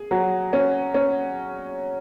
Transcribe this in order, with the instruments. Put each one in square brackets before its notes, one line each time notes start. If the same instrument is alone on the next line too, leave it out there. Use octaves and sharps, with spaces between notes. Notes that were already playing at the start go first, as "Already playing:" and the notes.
Already playing: [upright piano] G#4
F#3
C#4
C#4